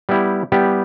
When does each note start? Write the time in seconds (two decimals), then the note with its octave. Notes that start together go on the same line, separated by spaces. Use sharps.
0.09 G3 B3 E4 G4
0.52 G3 B3 E4 G4